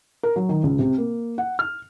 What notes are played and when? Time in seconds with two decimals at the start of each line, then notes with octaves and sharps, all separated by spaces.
0.23 A#4
0.36 F#3
0.49 D#3
0.63 C#2
0.79 C3
0.98 A#3
1.38 F#5
1.59 F6